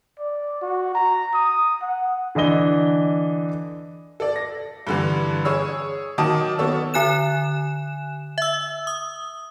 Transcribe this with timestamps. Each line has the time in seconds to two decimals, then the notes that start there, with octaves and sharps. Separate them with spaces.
0.19 D5
0.62 F#4
0.95 A#5
1.34 D#6
1.82 F#5
2.35 D3 E3 D4 D#5 G7
4.20 A4 D5
4.36 A#6
4.87 G2 D3 E3
5.45 G#4 C#5 E6
6.18 D#3 F#3 A5 D6 D#6
6.59 B3 A4 C#5 E6
6.94 D3 G#5 F#6 E7
8.38 E5 E6
8.87 D#6